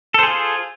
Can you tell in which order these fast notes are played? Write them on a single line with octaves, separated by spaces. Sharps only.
A4 C5 G#4 F4